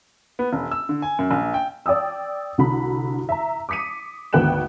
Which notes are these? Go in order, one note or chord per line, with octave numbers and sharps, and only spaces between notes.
B3
E1
E6
D3
G#5
F#2
A#1
G5
D5 G5 D#6 E6
C2 D3 F#4 B5
E5 A#5
D6 D#6 B6 C#7 D#7
G#1 D2 B3 G5 F#6 E7